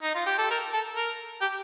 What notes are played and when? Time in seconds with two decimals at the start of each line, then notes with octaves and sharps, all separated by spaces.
0.03 D#4
0.15 F4
0.26 G4
0.38 A4
0.50 A#4
0.73 A4
0.96 A#4
1.41 G4